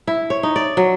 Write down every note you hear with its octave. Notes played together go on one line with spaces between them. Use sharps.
E4
C#5
D#4
D5
F#3